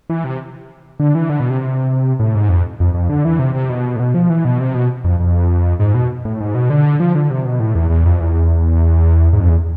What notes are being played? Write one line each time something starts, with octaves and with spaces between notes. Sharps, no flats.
E3
C3
D3
E3
D3
B2
C3
A2
G#2
F2
F2
F2
D3
E3
C3
C3
B2
A2
B2
F3
E3
B2
C3
B2
F2
F2
G#2
B2
A2
G#2
B2
D3
F3
D3
C3
B2
A2
E2
E2
F2
E2
G#2
F2
E2